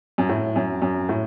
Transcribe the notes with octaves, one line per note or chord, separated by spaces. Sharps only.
F#2
A2
F#2
F#2
A2